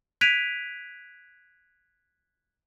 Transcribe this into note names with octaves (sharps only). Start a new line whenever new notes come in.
F#6 G#6 B6 D7 D#7 F7